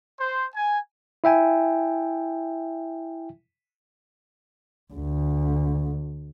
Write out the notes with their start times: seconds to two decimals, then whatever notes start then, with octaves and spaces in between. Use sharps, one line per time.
0.19 C5
0.54 G#5
1.24 E4 E5 G5 G#5
4.93 D2